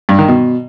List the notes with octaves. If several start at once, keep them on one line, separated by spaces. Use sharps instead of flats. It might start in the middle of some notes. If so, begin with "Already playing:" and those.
G2
D#3
B2